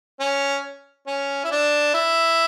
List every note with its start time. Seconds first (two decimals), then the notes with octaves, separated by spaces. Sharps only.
0.20 C#4
1.07 C#4
1.44 E4
1.51 D4
1.94 E4